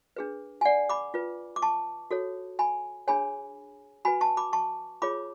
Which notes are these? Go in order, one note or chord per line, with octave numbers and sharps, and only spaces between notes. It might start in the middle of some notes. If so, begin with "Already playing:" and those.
D4 G#4 B4
G#5
D5 F#5
B5 D6
F4 B4
D6
A5 C#6
F#4 A4 C#5
G#5 B5
D4 G#4 C#5 G#5 B5
F#4 B4 G#5 B5
A5 C#6
B5 D6
A5 C#6
F4 G#4 C#5 B5 D6